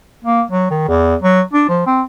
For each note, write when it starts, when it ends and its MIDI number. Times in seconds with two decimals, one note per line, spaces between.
0.24 0.42 58
0.51 0.70 54
0.71 0.84 51
0.88 1.15 40
1.22 1.41 54
1.53 1.65 62
1.68 1.84 53
1.87 2.02 60